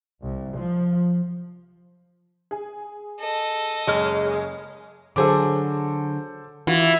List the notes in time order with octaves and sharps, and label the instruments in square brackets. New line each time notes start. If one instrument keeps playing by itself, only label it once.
[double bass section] C2
F3
[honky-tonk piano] G#4
[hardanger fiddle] A4 D#5
[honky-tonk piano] F#1 C#5 F6 [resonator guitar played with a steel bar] G#3
[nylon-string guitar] D3 F#3 G#4 [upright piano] A4 C5 D6
[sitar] E3 [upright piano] F4 [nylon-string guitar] F#4